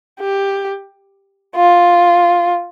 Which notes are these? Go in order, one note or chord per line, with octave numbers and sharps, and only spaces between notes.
G4
F4